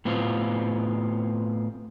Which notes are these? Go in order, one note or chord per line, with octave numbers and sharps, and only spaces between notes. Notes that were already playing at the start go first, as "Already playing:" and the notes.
A2 B3 C4 F4